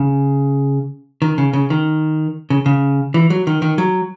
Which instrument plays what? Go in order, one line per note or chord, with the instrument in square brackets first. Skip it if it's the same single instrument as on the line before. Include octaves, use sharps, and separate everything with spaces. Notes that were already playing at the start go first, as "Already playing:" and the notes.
Already playing: [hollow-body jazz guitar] C#3
D#3
C#3
C#3
D#3
C#3
C#3
E3
F#3
D#3
D#3
F#3